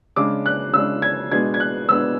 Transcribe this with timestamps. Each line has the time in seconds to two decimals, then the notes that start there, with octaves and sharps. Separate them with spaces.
0.16 C#3 G#3 D4 D6
0.46 F#6
0.73 C#3 G#3 D4 E6
1.02 G#6
1.31 B2 G#3 B3 D4 G#6
1.54 G#6
1.60 F#6
1.89 B2 G#3 B3 D4 E6